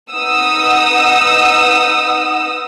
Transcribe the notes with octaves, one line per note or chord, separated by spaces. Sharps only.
D#4 B4 F#5 D#6 E6